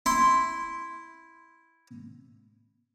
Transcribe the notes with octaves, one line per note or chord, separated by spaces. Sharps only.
E4 C6